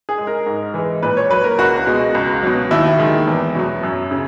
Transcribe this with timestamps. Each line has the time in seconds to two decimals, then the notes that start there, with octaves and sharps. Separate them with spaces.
0.09 G#4
0.18 G#3
0.27 A#4
0.46 G#2
0.74 E3 G#3
1.03 A#2 B4
1.17 C#5
1.30 F#3 B4
1.44 A#4
1.58 C#2 F#4
1.87 B2 G#3
2.15 C#2
2.43 B2 F#3
2.71 D#2 E4
2.99 D#3 G#3
3.27 E2
3.55 B2 F#3
3.83 F#2
4.11 C#3